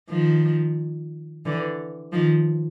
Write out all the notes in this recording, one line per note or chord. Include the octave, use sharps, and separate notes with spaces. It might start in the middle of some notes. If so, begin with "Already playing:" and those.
D#3 F3
D3 E3
D#3 F3